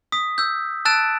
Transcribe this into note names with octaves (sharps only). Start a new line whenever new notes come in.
D#6 B6
E6 G6
A5 E6 F#6 A6 D7 E7